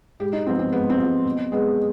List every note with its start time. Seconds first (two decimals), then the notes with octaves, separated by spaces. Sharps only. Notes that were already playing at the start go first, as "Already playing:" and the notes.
0.20 G#2 G4
0.33 D#4
0.47 F3 B3 C4
0.59 C4
0.72 G#2 B3
0.90 C4
0.98 F3 B3
1.25 B2
1.52 G#3 B3